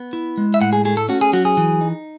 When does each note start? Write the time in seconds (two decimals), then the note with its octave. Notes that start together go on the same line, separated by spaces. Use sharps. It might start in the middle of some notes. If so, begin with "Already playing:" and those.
Already playing: B3
0.13 E4
0.37 G#3
0.54 E5
0.61 A2 F#5
0.73 G#4
0.85 A3 G#4
0.97 A4
1.09 C#4 F#4
1.21 G#4
1.33 F#3 F#4
1.45 G#4
1.57 E3
1.81 D#4